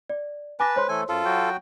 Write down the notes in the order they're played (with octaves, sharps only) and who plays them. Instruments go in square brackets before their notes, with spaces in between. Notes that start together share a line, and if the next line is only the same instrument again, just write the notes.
[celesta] D5
[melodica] B4 [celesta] G#5 D6 A#6 [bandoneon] A5
[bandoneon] G#3 [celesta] C5 C#5 C6
[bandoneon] E3 A3 A4 [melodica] G#5
[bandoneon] F#2 [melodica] F4 A4
[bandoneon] F#3 F#4 G5